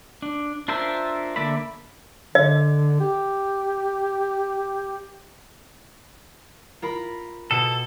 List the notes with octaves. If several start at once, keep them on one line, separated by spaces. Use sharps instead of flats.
D4
D4 F4 A#4 C5 E5
D3 A#3 D5 E5 B5
D3 D#5
G4
F4 A#4 B5
B2 A4